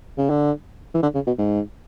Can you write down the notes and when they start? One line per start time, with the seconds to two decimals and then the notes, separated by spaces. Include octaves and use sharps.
0.18 C#3
0.30 D3
0.94 E3
1.02 D3
1.14 C#3
1.27 B2
1.38 G#2